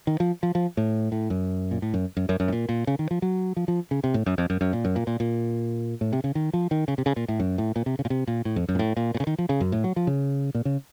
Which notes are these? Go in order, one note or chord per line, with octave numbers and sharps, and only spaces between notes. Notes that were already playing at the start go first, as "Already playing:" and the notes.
D#3
F3
F3
F3
A2
A2
F#2
A#2
A2
F#2
F#2
F#2
F#2
A2
A#2
A#2
C#3
D#3
F3
F#3
F3
F3
C#3
C3
A2
F#2
F2
F#2
F#2
A#2
F#2
A#2
A#2
A#2
A2
C3
C#3
D#3
F3
D#3
C#3
C3
C#3
A#2
A2
F#2
A2
A#2
C3
C#3
A#2
C3
A#2
A2
F2
F#2
A#2
A2
A#2
A#2
C#3
D#3
F3
C#3
F#2
A2
F#3
F3
C#3
A#2
C#3